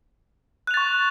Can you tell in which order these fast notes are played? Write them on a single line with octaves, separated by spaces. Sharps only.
F#6 F7 A6 C#6